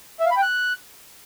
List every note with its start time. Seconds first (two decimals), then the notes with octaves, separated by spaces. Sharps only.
0.20 E5
0.26 F5
0.31 B5
0.37 G5
0.42 F#6